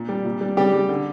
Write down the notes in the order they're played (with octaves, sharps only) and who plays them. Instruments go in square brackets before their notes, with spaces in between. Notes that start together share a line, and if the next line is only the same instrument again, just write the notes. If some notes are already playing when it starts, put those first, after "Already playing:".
Already playing: [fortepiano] A#2
G3
A#2
G3
C#3 G3 G4
G3
D3